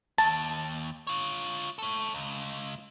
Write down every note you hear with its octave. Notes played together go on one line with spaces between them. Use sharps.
D#2 A5
F4 C#5
A4 C#5
C#2